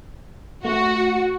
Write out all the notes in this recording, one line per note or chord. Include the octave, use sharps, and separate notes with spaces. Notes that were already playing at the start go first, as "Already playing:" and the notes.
A3 F#4